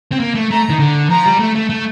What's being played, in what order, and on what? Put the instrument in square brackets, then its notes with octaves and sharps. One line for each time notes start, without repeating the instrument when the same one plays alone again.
[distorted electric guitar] C4
A#3
A3
[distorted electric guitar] A3 [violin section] A#5
[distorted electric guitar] D#3
D3
[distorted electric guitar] F3 [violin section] A#5
[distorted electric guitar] G3
A3
A3
A3